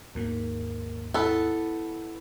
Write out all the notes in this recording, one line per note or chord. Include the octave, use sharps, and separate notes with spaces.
D#2 G#2 A#3
B3 E4 A4